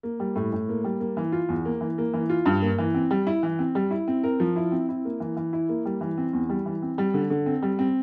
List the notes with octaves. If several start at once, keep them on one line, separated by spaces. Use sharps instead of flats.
A#3
G3
A2
A2
A#3
G3
A#3
E3
F4
E2
A#3
E3
A#3
E3
F4
G2
A#3
E3
C4
G3
E4
E3
C4
G3
E4
C4
A#4
F3
E4
C4
E4
A#3
E3
E3
E4
A#3
G3
E3
C4
E2
G3
E3
C4
G3
D3
D3
C4
G3
C4